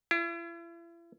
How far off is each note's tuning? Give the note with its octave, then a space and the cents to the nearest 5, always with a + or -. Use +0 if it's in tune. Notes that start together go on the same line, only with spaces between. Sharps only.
E4 +40